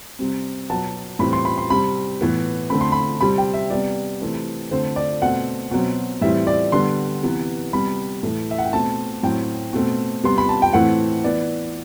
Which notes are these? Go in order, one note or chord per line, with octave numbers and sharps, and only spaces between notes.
C3 G3 C4
B2 F#3 B3 A5
A2 E3 G3 C4 B5
C6
B5
C6
C3 G3 C4 B5
A2 E3 B3
D3 A3 C4 B5
C6
B5
C3 G3 C4 B5
G5
E5
C3 G3 B3 D5
C3 E3 A3 C4
D3 A3 C4 C5
D5
B2 A3 C4 F#5
B2 F#3 C4
A2 E3 G3 C4 E5
D5
D3 G3 B3 C6
C3 E3 B3
C3 G3 B3 B5
A2 E3 A3
E5
F#5
G5
B2 A3 C4 A5
A2 F#3 C4 G5
B2 A3 C4
C3 G3 B3 C6
B5
A5
G5
A2 E3 A3 C4 F#5
E3 B3 D5